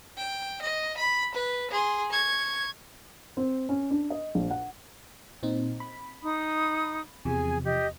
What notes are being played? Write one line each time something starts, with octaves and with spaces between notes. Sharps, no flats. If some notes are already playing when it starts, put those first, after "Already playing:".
G5
D#5
B5
B4
G#4 C6
C#6 G#6
C4
C#4
D4
D#5
A#1
F#5
A#2 C4 D#4
B5
D#4 D#6
E2 C3 F3 G#4 G#5
G4 D#5